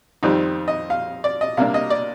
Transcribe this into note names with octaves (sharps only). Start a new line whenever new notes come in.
F2 D#3 G3 C4 D#4
D#5
F5
D5
D#5
C3 G3 A#3 D4 F5
D#5
D5